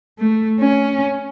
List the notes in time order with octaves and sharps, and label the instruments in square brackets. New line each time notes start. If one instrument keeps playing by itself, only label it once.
[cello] A3
C#4